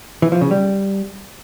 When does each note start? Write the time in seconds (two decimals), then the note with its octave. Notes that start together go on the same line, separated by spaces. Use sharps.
0.22 E3
0.32 F3
0.41 C#3
0.51 G3